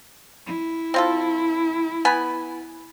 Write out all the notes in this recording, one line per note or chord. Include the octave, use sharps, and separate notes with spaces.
E4
C4 F4 A4
B3 G#5 B5